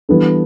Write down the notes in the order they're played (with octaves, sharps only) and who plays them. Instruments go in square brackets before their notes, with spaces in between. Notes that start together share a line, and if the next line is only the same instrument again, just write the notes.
[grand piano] E3 G3 B3 D4 A4